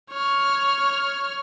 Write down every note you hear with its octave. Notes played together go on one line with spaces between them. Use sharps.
C#5 F6